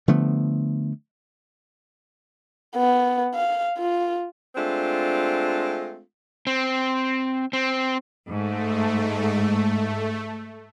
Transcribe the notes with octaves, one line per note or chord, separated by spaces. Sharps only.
D3 F3 A3 B3
B3
F5
F4
G#3 A3 C4 D4 F4
C4
C4
G#2 A3